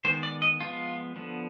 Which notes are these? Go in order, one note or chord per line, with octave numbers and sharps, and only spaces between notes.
D#3 G#3 B3 C5
D5
D#5
F3 G#3 B3 F4
D3 F3 B3